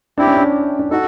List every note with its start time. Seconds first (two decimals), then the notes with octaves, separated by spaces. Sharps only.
0.18 C4 D4 E4 G4
0.27 C#4
0.37 D4
0.79 D4
0.91 D#4 F#4 A4